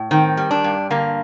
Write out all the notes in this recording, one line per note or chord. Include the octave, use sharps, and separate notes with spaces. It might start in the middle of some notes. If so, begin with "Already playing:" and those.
Already playing: A2
D#3 C4
G3
D4
G2
D3 A#3